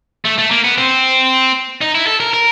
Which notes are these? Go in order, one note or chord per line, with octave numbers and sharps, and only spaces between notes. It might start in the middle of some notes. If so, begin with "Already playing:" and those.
A3
A3
A#3
B3
C4
D#4
E4
A4
A#4
A#4